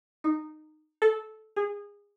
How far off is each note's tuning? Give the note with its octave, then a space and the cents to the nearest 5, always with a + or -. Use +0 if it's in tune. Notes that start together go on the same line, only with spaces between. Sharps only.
D#4 -15
A4 -15
G#4 -25